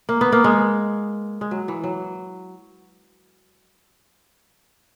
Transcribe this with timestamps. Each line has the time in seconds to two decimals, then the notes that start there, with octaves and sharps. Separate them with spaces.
0.09 A#3
0.21 B3
0.32 A#3
0.44 G#3
1.41 G#3
1.51 F#3
1.68 E3
1.84 F#3